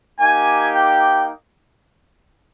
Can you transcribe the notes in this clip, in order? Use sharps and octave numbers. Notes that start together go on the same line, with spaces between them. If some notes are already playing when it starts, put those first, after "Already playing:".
A#3 D#4 G4 G#5
G5